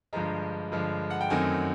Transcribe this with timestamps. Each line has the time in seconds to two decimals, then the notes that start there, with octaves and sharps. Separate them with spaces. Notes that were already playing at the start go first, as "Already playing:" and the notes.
0.13 G2 D3 F3 G#3 A#5
0.72 G2 D3 F3 G#3
1.10 F#5
1.21 G5
1.30 F#2 D#3 F#3 A3 C4 G#5